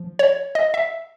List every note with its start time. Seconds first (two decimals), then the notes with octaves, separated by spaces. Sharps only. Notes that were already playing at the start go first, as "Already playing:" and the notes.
Already playing: F3
0.19 C#5
0.55 D#5
0.74 E5